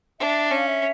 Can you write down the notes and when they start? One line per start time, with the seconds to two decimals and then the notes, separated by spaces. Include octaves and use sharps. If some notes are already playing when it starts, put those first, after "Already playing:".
0.20 D4 E5
0.51 C#4 F5
0.67 E5